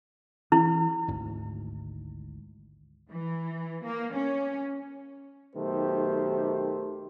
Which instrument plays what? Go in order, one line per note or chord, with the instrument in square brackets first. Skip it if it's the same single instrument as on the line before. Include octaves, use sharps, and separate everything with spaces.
[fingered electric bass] E3 [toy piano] E4
[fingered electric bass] G#1 D2 G#2
[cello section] E3
A#3
C#4
[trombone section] B1 D#3 A3 G4 C5